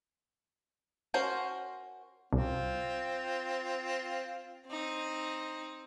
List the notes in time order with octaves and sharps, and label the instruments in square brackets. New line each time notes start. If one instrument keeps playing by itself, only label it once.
[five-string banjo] C#4 F#4 A#4 C5
[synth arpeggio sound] C2 [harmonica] C4 F4
[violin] C4 D#4